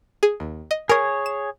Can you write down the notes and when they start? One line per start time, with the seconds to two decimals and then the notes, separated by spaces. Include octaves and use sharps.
0.23 G#4
0.40 D#2
0.71 D#5
0.89 G#4 A#4 C#5 D#6
1.26 E7